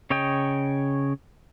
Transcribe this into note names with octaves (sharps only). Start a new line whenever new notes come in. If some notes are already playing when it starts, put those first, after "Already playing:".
C#3 C#5 D#5 G5